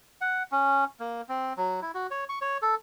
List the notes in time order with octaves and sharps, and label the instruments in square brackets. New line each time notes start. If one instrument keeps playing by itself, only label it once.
[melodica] F#5
C#4
A#3
C4
F#3
E4
F#4
C#5
C#6
C#5
A4